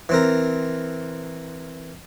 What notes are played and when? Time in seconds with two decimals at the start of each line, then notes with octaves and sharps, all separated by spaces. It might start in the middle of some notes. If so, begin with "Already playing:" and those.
0.09 E3 C4 A#4